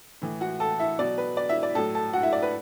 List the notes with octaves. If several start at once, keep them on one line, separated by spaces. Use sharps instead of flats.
A2 E3
F#4 F#5
A4 A5
E4 E5
B2 F#3 D5
B4
D5
E4 E5
D5
A2 F#3 A4 A5
A4 A5
F#4 F#5
E4 E5
D5
B4